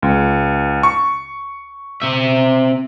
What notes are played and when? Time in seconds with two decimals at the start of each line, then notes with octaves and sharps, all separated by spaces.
0.03 C#2
0.83 C#6
2.02 C4 E5